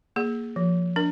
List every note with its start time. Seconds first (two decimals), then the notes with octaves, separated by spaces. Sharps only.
0.16 A#3 G#4
0.56 F3
0.96 D4 A#4